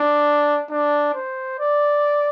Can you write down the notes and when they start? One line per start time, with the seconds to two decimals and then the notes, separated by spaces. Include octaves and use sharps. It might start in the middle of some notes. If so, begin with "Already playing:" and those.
Already playing: D4
0.70 D4
1.14 C5
1.59 D5